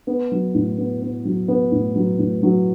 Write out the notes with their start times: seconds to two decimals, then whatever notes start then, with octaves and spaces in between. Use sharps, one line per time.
0.07 B3
0.32 F#3
0.55 A2
0.78 B3
1.02 B3
1.25 F#3
1.48 B3
1.72 A2
1.96 F#3
2.19 A2
2.43 F#3